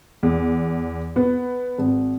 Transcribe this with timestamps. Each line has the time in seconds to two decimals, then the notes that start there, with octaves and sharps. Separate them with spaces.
0.23 E2
1.16 B3
1.78 G#1